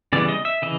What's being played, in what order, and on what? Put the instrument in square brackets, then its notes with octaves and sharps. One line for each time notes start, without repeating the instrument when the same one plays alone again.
[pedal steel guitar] C#3 E3 G3 B3 D5
D#5
E5
C#3 E3 D#5